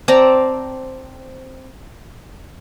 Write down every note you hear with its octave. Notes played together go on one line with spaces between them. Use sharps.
C4 D5 A5 A#5